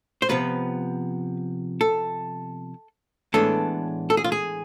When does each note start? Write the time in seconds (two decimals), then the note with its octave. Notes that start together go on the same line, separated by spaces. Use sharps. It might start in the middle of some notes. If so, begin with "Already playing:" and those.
0.22 C5
0.29 C3 F3 B3 B4
1.81 A4
3.34 A2 E3 G#3 B3 D4 A4
4.10 A4
4.17 G#4
4.24 F4
4.32 G#4